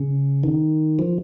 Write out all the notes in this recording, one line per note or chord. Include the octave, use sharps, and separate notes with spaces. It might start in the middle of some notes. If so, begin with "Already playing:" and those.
Already playing: C#3
D#3
F3